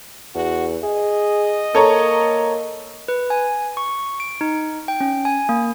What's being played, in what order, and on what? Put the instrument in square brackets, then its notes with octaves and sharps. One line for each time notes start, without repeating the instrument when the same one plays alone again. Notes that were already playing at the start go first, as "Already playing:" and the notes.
[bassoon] E2 [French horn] F#4
[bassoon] G#4 [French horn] D#5
[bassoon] A#3 [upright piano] A4 C#5 A#5
[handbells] B4
G#5
C#6
D7
D#4
G5
C#4
G#5
A#3